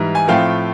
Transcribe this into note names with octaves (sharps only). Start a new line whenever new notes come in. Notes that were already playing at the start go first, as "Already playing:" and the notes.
Already playing: G#2 E3 G3
G#5
A2 F3 A3 C4 F5 G5